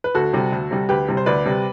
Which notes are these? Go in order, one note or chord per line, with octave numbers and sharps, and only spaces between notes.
B4
D2 F#4 A4
C3 G3
D2
C3 G3
D2 G4 B4
C3 G3
C5
D2 B4 D5
C3 G3